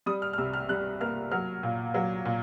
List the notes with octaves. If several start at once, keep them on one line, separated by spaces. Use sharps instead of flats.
G3 D#6
F6
F6
C2 E6
F6
G3 F#6
A#3 F6
F#3 F6
A#2
F#3
A#2